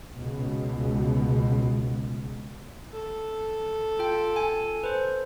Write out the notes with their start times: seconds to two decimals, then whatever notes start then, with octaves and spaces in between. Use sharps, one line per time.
0.19 C#2 B2
2.93 A4
3.99 F4 G5
4.36 G#5
4.84 B4 C5